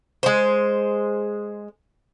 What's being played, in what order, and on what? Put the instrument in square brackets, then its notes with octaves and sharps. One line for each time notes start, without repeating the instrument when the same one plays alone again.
[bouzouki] G#3 C5